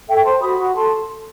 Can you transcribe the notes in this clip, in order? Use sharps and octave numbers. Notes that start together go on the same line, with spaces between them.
A4 E5 G5
C5 A5 C6
F#4 B5 D#6
F#4
A4 A5 C6